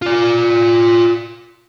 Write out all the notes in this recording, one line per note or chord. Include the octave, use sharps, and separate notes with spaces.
F4 D5